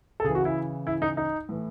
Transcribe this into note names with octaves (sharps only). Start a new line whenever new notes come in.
A4
C#3 E3 G#4
F#4
E4
E4
D#4
D#4
A2 E3